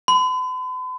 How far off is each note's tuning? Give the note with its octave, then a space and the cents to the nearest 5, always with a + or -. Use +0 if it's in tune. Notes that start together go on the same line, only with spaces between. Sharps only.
B5 +45